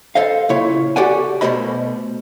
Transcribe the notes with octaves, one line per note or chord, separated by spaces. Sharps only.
A4 C5 D#5 F5
A#2 C#3 E4 C#5
F#4 G4 A4 D5 F#5 G#5
B2 E3 A3 C5 D#5 B5